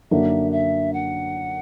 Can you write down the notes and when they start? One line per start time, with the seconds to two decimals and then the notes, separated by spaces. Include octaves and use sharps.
0.10 F#2 D3 A#3 D4 F#4 E5
0.51 E5
0.92 F#5